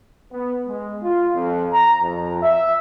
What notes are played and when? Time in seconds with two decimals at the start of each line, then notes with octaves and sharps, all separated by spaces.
0.32 B3
0.67 G#3
1.03 F4
1.35 F2
1.73 A#5
2.03 F2
2.43 E5